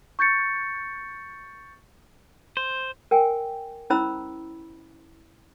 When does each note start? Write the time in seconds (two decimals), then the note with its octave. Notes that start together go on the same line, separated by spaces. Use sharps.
0.19 C#6 G6 A6 C#7
2.57 C5
3.11 A#4 G5 G#5
3.90 C#4 E4 C5 A#5 B5 E6